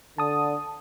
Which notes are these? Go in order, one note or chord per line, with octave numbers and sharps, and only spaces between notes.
D3 A5 D#6